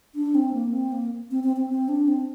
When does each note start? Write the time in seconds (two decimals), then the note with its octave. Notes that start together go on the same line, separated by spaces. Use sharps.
0.15 D4
0.35 C4
0.54 A#3
0.73 C4
0.92 A#3
1.31 C4
1.44 C4
1.56 C4
1.69 C4
1.89 D4
2.08 C4